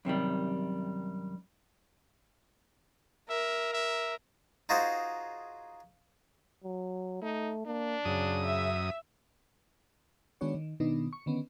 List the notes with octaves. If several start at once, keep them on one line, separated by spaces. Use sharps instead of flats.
F#2 C3 D#3 G3
A#4 E5
E5
D#4 F4 F#4 G#4 C5
F#3
A3 D#4
A#3 D4
F#2 C#3 D#6
E5
D#3 G#3 B3 D4 F#4 C#5
D#3
B2 D#3 B3 D4 D#4
C#6
D3 D#3 B3 C#4